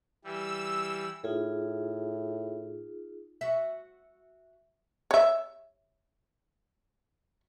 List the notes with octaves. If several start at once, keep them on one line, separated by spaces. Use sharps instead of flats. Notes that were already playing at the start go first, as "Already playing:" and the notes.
E3 G3 E6
A2 D#4 F4 G#4
F#4 E5
C#5 E5